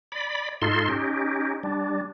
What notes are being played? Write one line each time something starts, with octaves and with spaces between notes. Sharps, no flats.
D5 B5
G#2 D#4 F4 A4 C6
C#4 D#4 G4
G3 D4